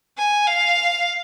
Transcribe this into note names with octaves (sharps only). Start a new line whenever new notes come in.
G#5
F5